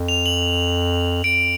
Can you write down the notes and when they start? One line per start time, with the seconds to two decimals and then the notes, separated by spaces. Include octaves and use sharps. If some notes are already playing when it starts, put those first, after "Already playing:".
Already playing: F2
0.08 F7
0.26 F#7
1.24 F2 D7